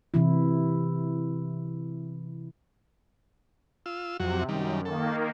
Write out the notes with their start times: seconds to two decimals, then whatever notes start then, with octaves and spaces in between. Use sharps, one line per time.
0.14 C3 E3 E4
3.86 F4 E6
4.20 F2 C3 F#3 F#4
4.49 F#2 D#3 G3
4.85 D#3 A#3 A4